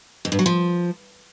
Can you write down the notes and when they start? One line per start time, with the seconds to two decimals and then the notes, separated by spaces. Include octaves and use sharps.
0.25 F2
0.32 G2
0.39 F#3
0.46 F3